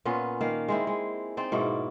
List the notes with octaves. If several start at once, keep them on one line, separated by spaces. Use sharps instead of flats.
A#2 B3 C#4 F4
D#3 A#3 F5
G#3 C4 E4
G#3
C4 D#4 D5
G#2 B2 A#3 E4